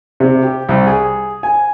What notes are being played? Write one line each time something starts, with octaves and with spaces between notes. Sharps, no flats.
C3
G4
C2
G#4
G#5